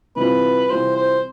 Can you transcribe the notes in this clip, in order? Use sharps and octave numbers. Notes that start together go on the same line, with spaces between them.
C3 E3 G3 C4 F4 B4
C3 E3 G3 C4 F4 C5
C5